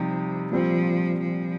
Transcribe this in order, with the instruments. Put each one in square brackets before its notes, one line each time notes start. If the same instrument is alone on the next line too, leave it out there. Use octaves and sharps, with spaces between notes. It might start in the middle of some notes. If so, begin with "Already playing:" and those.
Already playing: [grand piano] C3 G3 D#4 [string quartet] F3
[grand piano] A#2 G3 C4 [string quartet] F3
[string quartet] F3